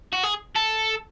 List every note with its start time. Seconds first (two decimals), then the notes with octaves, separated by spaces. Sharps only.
0.13 F#4
0.23 G#4
0.55 A4